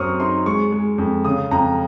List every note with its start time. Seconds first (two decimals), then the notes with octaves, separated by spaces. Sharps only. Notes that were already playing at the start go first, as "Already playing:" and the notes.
Already playing: F#2 C4 C#6 D#6 F6
0.20 D#4 C6
0.46 G#3 C#6
0.72 G#3
0.98 F2
1.24 C#3 D#6
1.51 F2 A#5